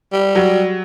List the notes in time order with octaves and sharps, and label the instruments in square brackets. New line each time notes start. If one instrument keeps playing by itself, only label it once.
[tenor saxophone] G3
[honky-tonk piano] F#3